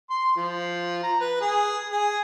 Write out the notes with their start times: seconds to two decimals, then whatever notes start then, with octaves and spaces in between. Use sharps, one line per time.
0.10 C6
0.36 F3
1.03 A#5
1.20 B4
1.41 G#4
1.91 G#4